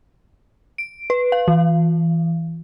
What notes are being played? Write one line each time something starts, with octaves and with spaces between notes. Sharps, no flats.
D7
B4
F5
E3